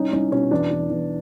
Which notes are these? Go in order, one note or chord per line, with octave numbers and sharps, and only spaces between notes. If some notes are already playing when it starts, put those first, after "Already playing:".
Already playing: C2 C#4 D#4
C2 C#4 D#4
B2 C#4
E2 D4
E2
E2